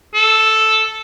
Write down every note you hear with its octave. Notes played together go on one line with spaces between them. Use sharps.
A4